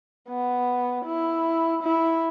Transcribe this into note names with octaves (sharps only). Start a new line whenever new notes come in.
B3
E4
E4